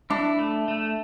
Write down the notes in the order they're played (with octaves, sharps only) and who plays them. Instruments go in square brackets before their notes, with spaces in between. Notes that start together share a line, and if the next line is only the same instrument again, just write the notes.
[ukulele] D4 [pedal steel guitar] E4
[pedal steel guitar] A3
A3